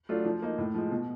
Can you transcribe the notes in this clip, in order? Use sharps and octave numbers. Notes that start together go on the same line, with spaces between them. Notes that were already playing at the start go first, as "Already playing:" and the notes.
F#3 A3 D4 F4
F3
A#3 D#4
A2
F3 G#3
B2